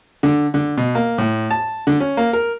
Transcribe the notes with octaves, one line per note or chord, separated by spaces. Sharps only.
D3
D3
B2
A#3
A2
A5
D3
C#4
A#3
A#4